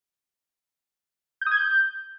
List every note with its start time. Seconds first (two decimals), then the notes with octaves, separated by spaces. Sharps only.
1.41 G6
1.47 D#6
1.52 G#6
1.57 G6